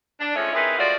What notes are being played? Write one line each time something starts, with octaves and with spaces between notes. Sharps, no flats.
D4
F3 G#3 A3 C#4 C#5
C4 D#4 E4 G#4 A#4 B4
F3 G#3 A3 F4 F#4 D5